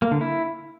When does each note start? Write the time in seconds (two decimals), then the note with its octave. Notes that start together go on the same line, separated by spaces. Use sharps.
0.02 A#3
0.11 D3
0.21 E4